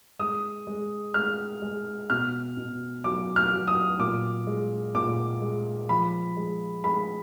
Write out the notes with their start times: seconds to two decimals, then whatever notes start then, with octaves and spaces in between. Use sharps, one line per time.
0.19 G#3 D#6
0.67 G#3
1.14 G#3 F6
1.62 G#3
2.10 B2 F6
2.57 B2
3.04 F#3 D6
3.36 F6
3.52 F#3
3.68 D#6
3.99 A#2 D6
4.47 G#3
4.95 A#2 D6
5.42 G#3
5.89 F3 B5
6.37 G#3
6.84 G#3 B5